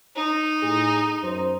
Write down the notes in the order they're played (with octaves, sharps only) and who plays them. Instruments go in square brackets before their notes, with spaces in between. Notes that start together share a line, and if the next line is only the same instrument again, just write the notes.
[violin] D#4
[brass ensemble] A2 G#4
F#2 C5